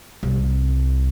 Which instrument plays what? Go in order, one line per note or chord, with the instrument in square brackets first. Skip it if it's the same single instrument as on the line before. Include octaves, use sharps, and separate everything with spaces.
[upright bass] C2